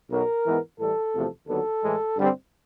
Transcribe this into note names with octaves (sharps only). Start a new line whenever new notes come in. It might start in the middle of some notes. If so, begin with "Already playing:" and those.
B1 B2 F#3 A#4
G#2 E3 G#3 B3
A2 E3 G3 A4
E2 C3 F3 A3
D#2 D3 F#3 B3 A4
A2 E3 G#3
G2 D3 G3 C4